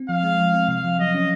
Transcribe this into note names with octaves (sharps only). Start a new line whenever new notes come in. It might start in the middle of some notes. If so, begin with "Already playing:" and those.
Already playing: C4
F3 F5
G#3
F3
C4
C3 F5
F3
F#3 D#5
C#4